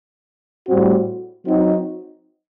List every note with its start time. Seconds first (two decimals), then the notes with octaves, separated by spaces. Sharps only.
0.67 A2 G3 C4 F#4
1.46 F#3 C4 D#4 F#4